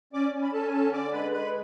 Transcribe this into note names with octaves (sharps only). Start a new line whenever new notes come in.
C#4 D5 D6
C#4
B5
C#4 A4 A5
G#5
D3 A4 A5
D3 D5 D6
G#3 B4 B5
G#3 B4 B5